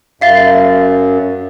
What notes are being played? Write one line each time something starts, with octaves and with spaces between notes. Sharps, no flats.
F#2 E5 F5 A6